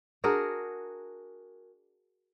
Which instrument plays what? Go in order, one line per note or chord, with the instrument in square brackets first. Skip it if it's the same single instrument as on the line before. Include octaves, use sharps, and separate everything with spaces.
[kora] D4 F#4 G#4 A#4